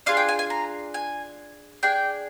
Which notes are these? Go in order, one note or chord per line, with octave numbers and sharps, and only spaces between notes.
D4 F4 G#4 F5
G5
G#5
G#5
A#5
G#5
D4 G#4 G5